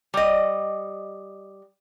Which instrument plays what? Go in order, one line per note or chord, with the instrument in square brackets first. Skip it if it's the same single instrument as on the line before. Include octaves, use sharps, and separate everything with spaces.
[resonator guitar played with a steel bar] G3 D#5